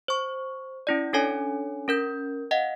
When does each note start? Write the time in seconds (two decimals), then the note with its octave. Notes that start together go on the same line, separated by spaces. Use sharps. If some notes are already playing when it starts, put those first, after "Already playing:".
0.08 C5 C#6
0.87 C#4 E4 D5
1.13 C#4 D4 A4 C#5 G#5
1.88 C#4 A#4 G6
2.51 D#5 F5 F#5